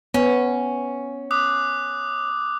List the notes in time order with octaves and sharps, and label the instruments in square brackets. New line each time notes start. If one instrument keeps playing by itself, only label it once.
[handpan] B3 [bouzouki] C#4
[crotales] D6 D#6 F#6